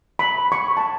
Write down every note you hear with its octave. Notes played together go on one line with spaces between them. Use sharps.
B5
C#6
A5